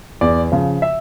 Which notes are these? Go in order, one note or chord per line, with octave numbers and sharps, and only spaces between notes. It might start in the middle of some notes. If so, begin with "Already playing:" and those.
E2 D5
C#3 F3
E5